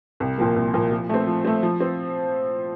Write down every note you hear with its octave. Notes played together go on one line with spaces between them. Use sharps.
C2
A#2 F3 A#3
C2
A#2 F3 A#3
F3
A3 C4
F3
A3 C4
F3
C4